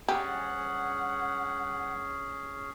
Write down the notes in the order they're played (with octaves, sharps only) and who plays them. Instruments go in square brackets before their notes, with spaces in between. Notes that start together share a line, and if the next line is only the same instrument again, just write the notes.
[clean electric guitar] G2 G#5 [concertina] C#4 G#4 [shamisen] G4 [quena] F#5